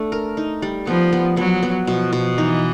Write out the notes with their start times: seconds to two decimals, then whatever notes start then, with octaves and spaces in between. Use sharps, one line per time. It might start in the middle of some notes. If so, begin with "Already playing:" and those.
Already playing: A3 D4
0.12 A#4
0.37 D#4
0.62 G3
0.87 F3 B3
1.13 B3
1.37 F#3 B3
1.63 B3
1.87 B2 F3
2.13 B2
2.37 E3 D#4